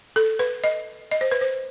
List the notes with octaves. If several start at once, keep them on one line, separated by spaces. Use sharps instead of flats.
A4
B4
D#5
D#5
C5
B4
C5